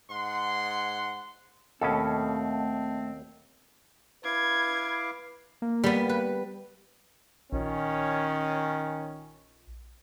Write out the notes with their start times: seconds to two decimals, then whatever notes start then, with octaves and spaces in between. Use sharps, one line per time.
0.10 G#2 F#5 C6
1.81 D#2 B2 A3 C4 C#4 A4
4.25 E4 B4 F5 D6 G#6
5.62 A#3
5.84 G3 B3
6.09 B4
7.52 A#1 D#3 C#4